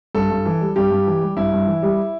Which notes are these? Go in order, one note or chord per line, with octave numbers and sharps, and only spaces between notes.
G2 A4
G2
E3
G3
G2 G4
G2
E3
G3
G2 E4
G2
E3
G3